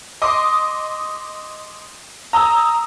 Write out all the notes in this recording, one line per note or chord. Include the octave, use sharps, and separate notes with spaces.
D#5 C6 D6 D#6
A#5 D#6 E6